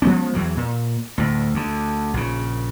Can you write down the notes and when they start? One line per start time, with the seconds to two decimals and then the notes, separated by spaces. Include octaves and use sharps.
0.02 F3 G#3 B3 C#4
0.34 E2 E3 F#3
0.57 A#2
1.18 D2 A2
1.54 D2 D3
2.14 A#1 C#3